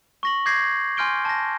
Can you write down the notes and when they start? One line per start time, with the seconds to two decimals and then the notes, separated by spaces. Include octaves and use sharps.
0.23 C#6 A#6 F#7
0.46 D6 G6 G#6 A#6 C7
0.97 G#5 C6 F6 G6 D7 G7
1.25 A5 A#6